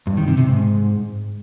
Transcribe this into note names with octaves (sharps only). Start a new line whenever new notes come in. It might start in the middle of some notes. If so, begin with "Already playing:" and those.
G2
D#3
C3
C3
G#2